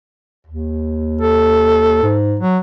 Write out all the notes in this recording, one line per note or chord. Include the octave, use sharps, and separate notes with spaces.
D#2
A4
G#2
F#3